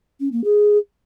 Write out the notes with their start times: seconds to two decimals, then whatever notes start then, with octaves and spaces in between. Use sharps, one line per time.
0.20 C#4
0.32 A#3
0.44 G#4